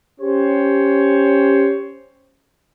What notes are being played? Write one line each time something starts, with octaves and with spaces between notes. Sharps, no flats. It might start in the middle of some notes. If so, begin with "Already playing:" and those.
C#4 G4 C5 C#5